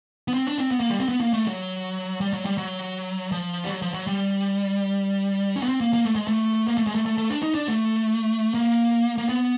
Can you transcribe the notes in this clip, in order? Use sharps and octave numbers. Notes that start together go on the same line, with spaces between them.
B3
C4
D4
C4
B3
A#3
G3
C4
B3
A#3
A3
F#3
G3
F#3
G3
F#3
F3
G3
F#3
F3
F#3
G3
C#4
B3
C4
A#3
A#3
A3
G#3
A3
A#3
A3
G#3
A3
A3
A3
D4
D#4
D4
A3
A#3
A#3
B3